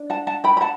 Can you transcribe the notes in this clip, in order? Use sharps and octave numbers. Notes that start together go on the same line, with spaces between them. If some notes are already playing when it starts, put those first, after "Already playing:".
Already playing: D4
F#5 A5
F#5 A5
G5 B5
B5
F#5 A5